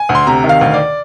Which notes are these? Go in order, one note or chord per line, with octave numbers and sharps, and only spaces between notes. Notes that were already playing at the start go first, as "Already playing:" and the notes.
Already playing: G#5
D2
C6
C3 A#5
D#3
F5
D2
D5